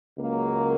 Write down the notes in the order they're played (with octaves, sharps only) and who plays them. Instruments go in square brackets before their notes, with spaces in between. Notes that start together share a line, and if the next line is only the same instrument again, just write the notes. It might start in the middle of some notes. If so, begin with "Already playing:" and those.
[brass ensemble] C#2 C#3 F#3 A#3